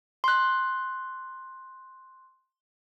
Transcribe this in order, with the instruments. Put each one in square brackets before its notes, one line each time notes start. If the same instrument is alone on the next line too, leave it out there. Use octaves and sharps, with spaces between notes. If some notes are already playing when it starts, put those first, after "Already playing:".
[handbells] C6 F#6